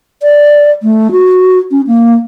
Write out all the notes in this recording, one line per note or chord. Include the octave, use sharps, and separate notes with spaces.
D5
A3
F#4
C#4
A#3